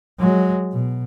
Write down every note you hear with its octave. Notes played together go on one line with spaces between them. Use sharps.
F#3 G#3
B2